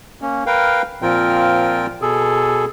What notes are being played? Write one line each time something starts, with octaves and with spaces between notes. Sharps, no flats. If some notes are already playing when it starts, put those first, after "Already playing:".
A#3 C#4
A#4 B4 F5 G5
A#2 F3 C4 F4 A#4 G5
B2 G#4 A4